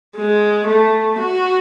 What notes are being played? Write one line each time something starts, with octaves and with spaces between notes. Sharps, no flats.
G#3
A3
F#4